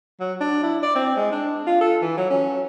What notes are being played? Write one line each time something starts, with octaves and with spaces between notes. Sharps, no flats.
F#3
D4
E4
D5
C4
G#3
D4
F4
A4
E3
F#3
C#4